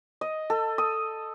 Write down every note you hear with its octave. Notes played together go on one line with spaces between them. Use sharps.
D#5
A4
D#6